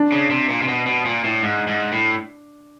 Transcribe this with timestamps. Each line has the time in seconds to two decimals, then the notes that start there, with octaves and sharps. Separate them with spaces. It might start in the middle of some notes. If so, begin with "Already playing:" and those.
Already playing: D4
0.12 C#3
0.30 C3
0.49 A#2
0.62 C3
0.68 B2
0.86 B2
1.05 A#2
1.24 A2
1.42 G#2
1.67 G#2
1.92 A2